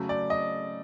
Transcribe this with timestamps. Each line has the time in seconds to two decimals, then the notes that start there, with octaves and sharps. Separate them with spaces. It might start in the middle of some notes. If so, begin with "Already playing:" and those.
Already playing: C#3 F#3 A3
0.09 D5
0.30 D#5